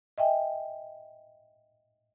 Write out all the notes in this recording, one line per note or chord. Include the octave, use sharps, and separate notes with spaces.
D#5 E5 G5 G#5